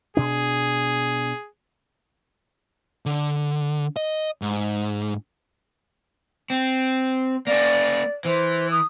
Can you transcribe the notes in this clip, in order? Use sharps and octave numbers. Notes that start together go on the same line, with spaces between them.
B2 D4 G#4
D3
D#5
G#2
C4
A#3 C#4 D5
E3 C5
D#6